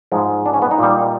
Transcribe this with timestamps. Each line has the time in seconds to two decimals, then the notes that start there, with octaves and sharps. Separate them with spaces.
0.12 G#2 F3 G#3
0.46 D4
0.54 C#4
0.62 B3
0.71 D#4
0.79 A#2 G3